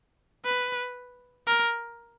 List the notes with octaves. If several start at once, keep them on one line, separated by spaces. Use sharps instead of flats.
B4
A#4